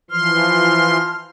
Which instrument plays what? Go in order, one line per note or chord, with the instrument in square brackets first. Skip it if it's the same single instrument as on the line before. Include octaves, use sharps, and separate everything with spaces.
[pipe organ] E3 F3 C6 [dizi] F6